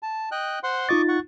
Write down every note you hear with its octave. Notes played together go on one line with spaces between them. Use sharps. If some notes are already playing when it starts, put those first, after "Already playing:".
A5
D#5 G5 F#6
C5 F#5 C6
D#4 F4 D#5 C#6 D6 A6
F#5 C#6